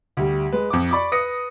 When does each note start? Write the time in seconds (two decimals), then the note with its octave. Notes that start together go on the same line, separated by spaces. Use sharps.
0.17 D2 G3
0.52 G#3 B4
0.70 F2 D6
0.91 D5 B5 C#6 D6
1.12 B4 D#6 A#6 C#7